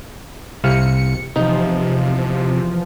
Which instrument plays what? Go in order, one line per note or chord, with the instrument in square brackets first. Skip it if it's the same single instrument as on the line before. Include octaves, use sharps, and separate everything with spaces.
[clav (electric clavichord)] C2 C3 F5 [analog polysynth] C#7
[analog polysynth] E2 F3 [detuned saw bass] C3 [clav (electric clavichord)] D#4